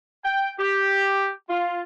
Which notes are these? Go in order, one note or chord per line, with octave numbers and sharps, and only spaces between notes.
G5
G4
F4